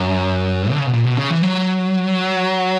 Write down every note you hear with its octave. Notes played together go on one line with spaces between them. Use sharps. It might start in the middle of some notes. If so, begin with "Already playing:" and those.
Already playing: F#2
D3
C#3
B2
A#2
B2
C#3
E3
F#3